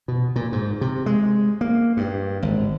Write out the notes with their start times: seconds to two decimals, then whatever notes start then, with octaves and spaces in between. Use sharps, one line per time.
0.08 B2
0.36 A#2
0.52 G#2
0.81 C3
1.06 G#3
1.61 A#3
1.97 G2
2.43 G#1